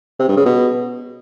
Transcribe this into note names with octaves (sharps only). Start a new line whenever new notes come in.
C3
G2
C#3
B2